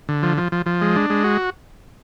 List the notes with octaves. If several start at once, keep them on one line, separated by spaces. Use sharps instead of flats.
D3
F3
F3
F3
F3
G#3
D4
G#3
F#4